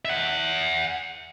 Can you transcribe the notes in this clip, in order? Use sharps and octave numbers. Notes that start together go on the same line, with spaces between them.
E5 F#5